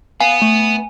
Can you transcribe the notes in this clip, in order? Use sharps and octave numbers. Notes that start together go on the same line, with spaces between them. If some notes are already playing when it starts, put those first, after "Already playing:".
B3 F5 G#5
A3